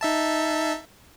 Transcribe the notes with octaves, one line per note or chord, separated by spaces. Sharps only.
D#4 E5 A5